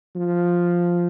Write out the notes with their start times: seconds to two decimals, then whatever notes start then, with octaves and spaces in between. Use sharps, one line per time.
0.15 F3